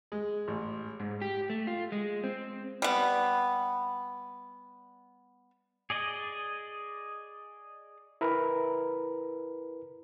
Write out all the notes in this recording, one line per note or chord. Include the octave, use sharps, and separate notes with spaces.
G#3
A1
G#2
G4
A3
F4
G#3
C4
G3 B3
G#4 D5 D#5
E4 A#4 B4